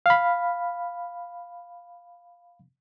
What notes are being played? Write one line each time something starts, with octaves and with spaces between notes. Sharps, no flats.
F5 B5